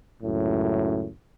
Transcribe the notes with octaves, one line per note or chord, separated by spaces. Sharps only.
C#2 F#2 A2